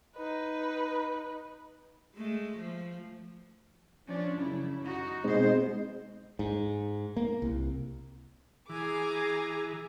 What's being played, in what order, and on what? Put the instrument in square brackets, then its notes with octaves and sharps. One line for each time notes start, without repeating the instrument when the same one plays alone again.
[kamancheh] D#4 B4
[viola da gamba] G#3 A3
F3
[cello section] F3 C#4 D4
F#2 C#3 E4
D#4 F#4
[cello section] B2 C5 [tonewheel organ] G#3 C4 D#4
[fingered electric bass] G#2
A#3
C2
[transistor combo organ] E3 [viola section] G#4 [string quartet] G#5 A#5 D6